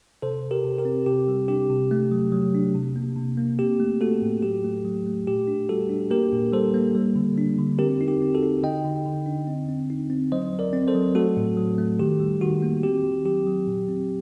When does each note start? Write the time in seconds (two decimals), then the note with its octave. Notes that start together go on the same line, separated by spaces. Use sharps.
0.22 C3 A4 C5
0.43 C3
0.51 G4 A#4
0.64 C3
0.78 G4 A#4
0.85 C4
1.06 C3 G4
1.28 G3
1.48 D4 G4
1.70 C3
1.91 A3
2.12 F#3
2.32 F#3
2.54 D4
2.75 C3
2.96 A#3
3.16 C3
3.37 A#3
3.59 C4 G4
3.80 A3
4.01 A3 F#4 A4
4.22 A2
4.43 F#3 G4
4.65 A3
4.85 F#3
5.07 A3
5.27 A#2 G4
5.47 D4
5.69 G3 F#4 A4
5.90 D4
6.11 A#3 G4 A#4
6.32 A#2
6.53 G3 A4 C5
6.74 A#3
6.95 G3
7.16 D3
7.38 D4
7.58 D3
7.79 C4 G4 A#4
8.01 D#4
8.08 G4
8.22 C4
8.35 F#4 A4
8.43 D#4
8.63 D3 D#5 G5
8.85 D3
9.06 D3
9.26 D4
9.47 C4
9.69 C4
9.90 D#4
10.10 C4
10.32 F#3 C5 D#5
10.53 F#3
10.59 A#4 D5
10.73 C4
10.88 A4 C5
10.94 F#3
11.15 A3 F#4 A4
11.37 A2
11.57 F#3
11.78 A3
11.99 D#3 G4
12.20 G3
12.41 D#3 F#4
12.62 A#3
12.83 C4 G4
13.04 D#3
13.25 F#3 G4
13.47 F#3
13.67 A#2
13.88 C4